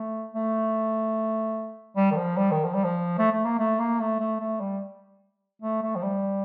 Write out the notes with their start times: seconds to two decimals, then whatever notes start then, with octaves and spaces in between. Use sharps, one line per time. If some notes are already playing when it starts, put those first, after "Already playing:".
Already playing: A3
0.34 A3
1.96 G3
2.11 D#3
2.16 F3
2.37 G3
2.51 D#3
2.64 F3
2.74 G3
2.84 F3
3.18 A3
3.32 A3
3.45 A#3
3.59 A3
3.79 A#3
4.00 A3
4.20 A3
4.40 A3
4.60 G3
5.62 A3
5.82 A3
5.96 F3
6.03 G3